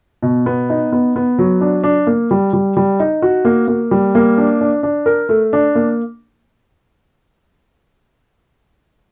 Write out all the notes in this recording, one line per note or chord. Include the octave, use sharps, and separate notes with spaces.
B2
B3
D#4
B3
B3
F#3
D4
D4
A#3
G3
G3
G3
D#4
F#4
A#3
A#3
G3
A#3
D4
D4
D4
A#4
A3
D4
A#3